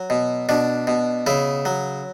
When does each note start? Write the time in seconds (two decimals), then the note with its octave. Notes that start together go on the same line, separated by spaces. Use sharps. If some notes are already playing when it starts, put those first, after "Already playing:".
Already playing: F#3
0.10 B2
0.49 B2 D4
0.87 B2
1.27 C#3 E4
1.65 F#3